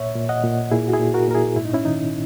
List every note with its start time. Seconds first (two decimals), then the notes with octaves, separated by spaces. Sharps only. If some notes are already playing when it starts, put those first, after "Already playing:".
Already playing: A#2 C#5 E5
0.15 A#2
0.29 D#5 F#5
0.44 A#2
0.71 A#2 E4 G#4
0.88 F#4
0.93 E4 G#4
1.00 A#2
1.14 F#4 A#4
1.28 A#2 A#4
1.35 E4 G#4
1.56 G#2 E4
1.65 D#4
1.73 C#4 E4
1.85 D#3 D#4